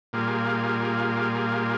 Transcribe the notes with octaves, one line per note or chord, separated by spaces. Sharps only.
A#2 G3 A#3 F4 G#4